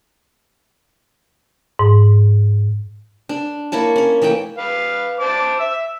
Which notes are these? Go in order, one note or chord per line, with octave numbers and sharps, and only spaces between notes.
G#2
D4
A#3 E4 C#5 A5
C#4 C#5
E3 A3 A#3 G5
B4 F5
C5 A5 D6
E5 E6